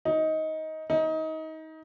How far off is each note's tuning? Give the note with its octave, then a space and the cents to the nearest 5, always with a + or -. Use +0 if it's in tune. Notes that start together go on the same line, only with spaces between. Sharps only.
D#4 +15
D#4 +25